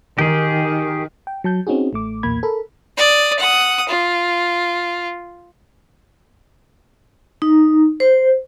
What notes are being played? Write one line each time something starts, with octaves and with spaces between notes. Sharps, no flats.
D#3 G4 G#4
G5
F#3 A5 G6
C4 C#4 D#4 F#4 G#4
A1 A3 D6
B1 E2 A#2 A#3 B5 G#6
A4 A#4 B5
D5 D#6
F#5 D#6
F4
D#4
C5